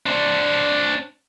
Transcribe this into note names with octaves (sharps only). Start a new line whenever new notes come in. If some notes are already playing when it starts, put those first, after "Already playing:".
D4 C5